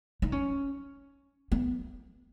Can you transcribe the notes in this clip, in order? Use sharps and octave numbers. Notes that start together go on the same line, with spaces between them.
D#4
C#4
B3